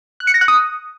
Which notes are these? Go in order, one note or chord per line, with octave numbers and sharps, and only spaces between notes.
F#6
C#7
A#6
F#6
D#6